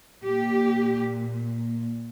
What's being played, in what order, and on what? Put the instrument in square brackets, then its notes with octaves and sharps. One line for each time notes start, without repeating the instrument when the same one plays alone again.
[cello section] A#2 G4